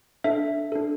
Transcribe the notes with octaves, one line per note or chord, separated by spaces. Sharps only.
D4 A4 E5
D4 A4